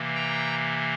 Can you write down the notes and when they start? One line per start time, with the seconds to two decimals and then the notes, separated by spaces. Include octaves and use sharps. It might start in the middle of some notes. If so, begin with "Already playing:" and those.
Already playing: C3 E3 A#3
0.15 G5 A#5